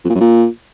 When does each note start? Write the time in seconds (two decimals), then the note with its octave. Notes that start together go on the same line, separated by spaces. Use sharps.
0.04 F2
0.10 A#2
0.15 F#2
0.20 A#2